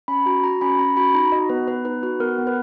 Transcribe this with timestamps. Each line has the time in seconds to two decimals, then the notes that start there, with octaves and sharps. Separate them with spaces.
0.08 C#4 B5
0.26 F#4 A#5
0.43 F#4 A#5
0.61 C#4 B5
0.79 C#4 A#5
0.97 F#4 B5
1.14 D#4 A#5
1.32 F#4 D#5
1.50 B3 B4
1.67 B3 B4
1.85 D#4 B4
2.03 F#4 B4
2.20 B3 A#4
2.38 B3
2.47 B4